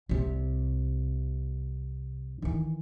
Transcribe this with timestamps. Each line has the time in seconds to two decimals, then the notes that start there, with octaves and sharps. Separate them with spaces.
0.09 C2 C3
2.42 D#3 E3